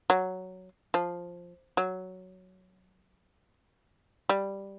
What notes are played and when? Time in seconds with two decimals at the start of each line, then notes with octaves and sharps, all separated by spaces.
0.10 F#3
0.94 F3
1.77 F#3
4.29 G3